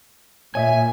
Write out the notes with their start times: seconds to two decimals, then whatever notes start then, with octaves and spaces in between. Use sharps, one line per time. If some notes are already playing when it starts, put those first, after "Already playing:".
0.55 A#2 C#5 D#5 E5 G#5